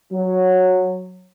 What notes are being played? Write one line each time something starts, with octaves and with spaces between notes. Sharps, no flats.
F#3